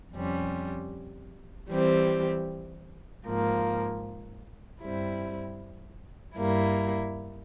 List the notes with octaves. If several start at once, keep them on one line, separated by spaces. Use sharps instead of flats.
F2 C3 G3 C#4
E3 G3 C4 G4
G#2 F3 A#3
G2 G3 C4 E4
G2 G3 A#3 E4